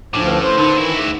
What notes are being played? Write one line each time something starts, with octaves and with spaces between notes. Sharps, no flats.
D2 A2 F3 D4 D6
C#4 B4
C5
D3 D#4 A#4 B5
D#3 E3 E4 F#4
D2 G#4